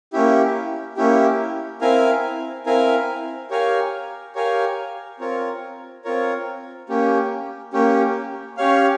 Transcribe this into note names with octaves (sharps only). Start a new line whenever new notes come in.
A#3 C#4 E4 G4
A#3 C#4 E4 G4
C4 E4 A#4 F5 G#5
C4 E4 A#4 F5 G#5
G4 A#4 C#5 F5 G#5
G4 A#4 C#5 F5 G#5
C4 F4 A#4 C#5
C4 F4 A#4 C#5
A#3 C#4 G4
A#3 C#4 G4
C#4 G4 C#5 F5